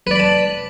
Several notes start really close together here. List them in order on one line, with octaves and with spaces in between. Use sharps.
B4 D5 B5 A5